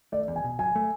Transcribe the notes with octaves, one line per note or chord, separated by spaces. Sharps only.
A3 D5
E2
G#5
B2
F#3 G#5
A3